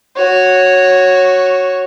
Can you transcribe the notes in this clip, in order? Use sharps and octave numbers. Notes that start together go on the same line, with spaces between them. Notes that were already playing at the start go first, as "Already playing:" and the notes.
F#4 C#5